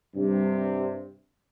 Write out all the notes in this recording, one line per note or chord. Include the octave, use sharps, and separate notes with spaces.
G2 C3